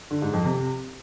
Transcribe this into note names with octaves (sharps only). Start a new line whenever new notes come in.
D3
G#2
F2
C3